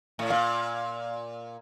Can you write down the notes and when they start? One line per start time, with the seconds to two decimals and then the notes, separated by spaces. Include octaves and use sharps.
0.19 A2
0.30 A#2 F5